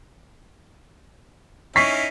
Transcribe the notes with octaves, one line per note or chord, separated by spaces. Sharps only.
C#4 D#4 E4 C#6 B6 C7